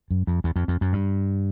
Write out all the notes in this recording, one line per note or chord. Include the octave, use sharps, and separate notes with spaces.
F#2
F2
E2
F2
F2
F#2
G2